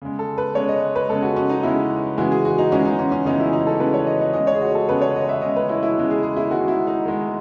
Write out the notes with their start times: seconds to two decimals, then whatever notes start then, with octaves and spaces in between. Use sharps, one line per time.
0.02 C#3 G#3
0.19 A4
0.38 B4
0.55 C#3 G#3 C#5
0.69 D#5
0.96 B4
1.09 C#3 G#3 A4
1.22 F#4
1.36 C#4
1.50 D#4
1.63 C#3 G#3 E4
2.17 C#3 E3 G#3 F#4
2.32 G#4
2.45 F#4
2.58 D#4
2.72 C#3 E3 G#3 C#4
2.86 D#4
2.99 C#4
3.12 C#4
3.25 C#3 E3 G#3 D#4
3.40 E4
3.53 D#4
3.67 A4
3.80 C#3 E3 G#3 B4
3.94 C#5
4.07 D#5
4.21 D#5
4.33 C#3 G#3 D#5
4.47 C#5
4.55 G#4
4.61 F#4
4.75 A4
4.88 C#3 G#3 B4
5.02 C#5
5.16 D#5
5.29 E5
5.42 C#3 G#3 D#5
5.56 B4
5.69 E4
5.83 E4
5.97 C#3 G#3
6.10 G#4
6.23 G#4
6.37 E4
6.50 D#3 G#3 F#4
6.68 E4
6.87 D#4
7.05 D#3 G#3